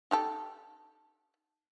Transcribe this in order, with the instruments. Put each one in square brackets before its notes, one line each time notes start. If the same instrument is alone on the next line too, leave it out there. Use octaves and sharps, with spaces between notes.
[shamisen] D#4 G4 A4